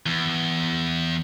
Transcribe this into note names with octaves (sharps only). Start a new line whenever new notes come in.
E2